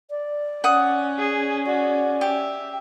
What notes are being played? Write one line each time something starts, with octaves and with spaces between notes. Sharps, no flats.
D5
C#4 F#5 D#6
G#4
F#4 D5
G4 E5